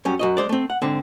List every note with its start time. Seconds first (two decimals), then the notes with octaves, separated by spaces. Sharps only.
0.05 F#2 G3 C#4
0.19 F#2 F#4 D#5
0.37 G#3 C5 D5
0.49 A3 C4
0.70 F#5
0.82 G#2 D3 C4